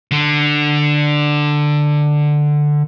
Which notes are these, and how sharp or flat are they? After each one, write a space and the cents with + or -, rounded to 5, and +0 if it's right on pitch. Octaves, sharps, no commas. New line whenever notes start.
D3 +10